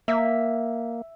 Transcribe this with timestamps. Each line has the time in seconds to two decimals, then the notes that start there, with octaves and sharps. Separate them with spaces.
0.08 A#3 E5